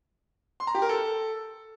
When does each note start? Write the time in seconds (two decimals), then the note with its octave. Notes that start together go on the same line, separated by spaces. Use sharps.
0.60 C6
0.67 A#5
0.75 G4
0.82 A#4
0.89 A4